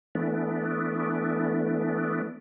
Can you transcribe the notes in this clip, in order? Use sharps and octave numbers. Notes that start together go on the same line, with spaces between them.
E3 A3 B3 D4